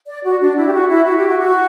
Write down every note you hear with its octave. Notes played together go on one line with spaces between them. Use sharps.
D5
F#4
D4
E4
G4
F#4
E4
F#4
G4
F#4
F#4